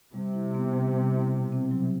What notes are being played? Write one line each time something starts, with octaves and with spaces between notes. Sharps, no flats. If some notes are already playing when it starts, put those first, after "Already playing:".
C3 G3
E4
B3
G3
G3
E4
B2
C4
F#3